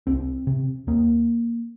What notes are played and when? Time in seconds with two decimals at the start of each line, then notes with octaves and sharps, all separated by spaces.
0.07 C2 C4
0.47 C3
0.87 D#2 A#3